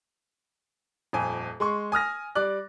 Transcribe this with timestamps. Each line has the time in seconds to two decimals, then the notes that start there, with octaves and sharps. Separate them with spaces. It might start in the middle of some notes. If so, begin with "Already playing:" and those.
1.13 D#1 F2 G#5
1.60 G#3 C6 C#6
1.92 G#5 D#6 F6 A#6
2.35 G3 D5 F#6